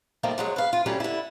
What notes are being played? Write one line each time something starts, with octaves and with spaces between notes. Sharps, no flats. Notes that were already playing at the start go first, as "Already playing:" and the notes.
D#3 F3 G3 A3 A#3
F3 F#3 G#3
B4 F5
F4
F#3 G3 A3 C#4
D3 E4